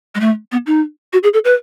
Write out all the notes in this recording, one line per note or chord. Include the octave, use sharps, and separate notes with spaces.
G#3
A3
B3
D#4
F#4
G#4
A4
B4